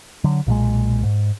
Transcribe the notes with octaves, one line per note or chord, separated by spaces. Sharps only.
D3 F#3
B1 A#2 D#3 G#3
G#2